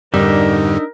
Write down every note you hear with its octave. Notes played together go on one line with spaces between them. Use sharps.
F2 G#2 D3 G3 D4 D#4 A#4 E5